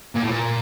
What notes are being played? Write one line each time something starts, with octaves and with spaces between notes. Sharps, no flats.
A#2
A2
A#2